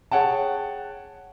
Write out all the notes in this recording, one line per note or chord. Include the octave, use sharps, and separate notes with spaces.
G#4 C#5 F#5 G5 A5